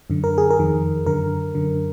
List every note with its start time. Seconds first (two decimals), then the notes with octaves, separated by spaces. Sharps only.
0.10 F#2 D3
0.24 A#4
0.38 G#4
0.50 A#4
0.59 F2 D#3
1.06 F#2 D3 A#4
1.55 F#2 D3